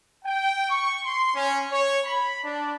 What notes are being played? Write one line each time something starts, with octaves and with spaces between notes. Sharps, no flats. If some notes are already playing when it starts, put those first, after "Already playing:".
G5
C#6
C6
C#4
C#5
B5
D4